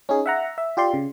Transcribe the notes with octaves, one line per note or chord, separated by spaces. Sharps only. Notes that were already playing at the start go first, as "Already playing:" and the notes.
C#4 D#4 G#4
E5 F#5 A#5
E5
F4 G4 D5 C6
C#3